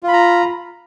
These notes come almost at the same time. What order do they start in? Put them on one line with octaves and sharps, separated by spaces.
F4 B5 A#5